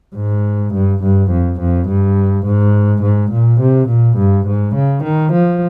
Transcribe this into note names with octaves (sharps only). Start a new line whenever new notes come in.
G#2
G2
G2
F2
F2
G2
G#2
G#2
A#2
C3
A#2
G2
G#2
C#3
D#3
F3